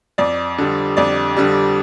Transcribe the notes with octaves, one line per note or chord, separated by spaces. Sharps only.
F2 D5
D3 G3
F2 D5
D3 G3